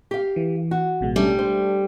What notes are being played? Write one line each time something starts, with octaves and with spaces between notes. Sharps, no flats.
G4 F5
E3
F#4
A1 B2 G#3
G3 A3 C#4 D4
C5